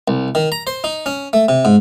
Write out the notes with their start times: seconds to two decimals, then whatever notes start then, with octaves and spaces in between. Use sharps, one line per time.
0.08 C2
0.35 D#3
0.52 A#5
0.67 C5
0.84 D#4
1.06 C#4
1.33 A3
1.49 C3
1.65 G#2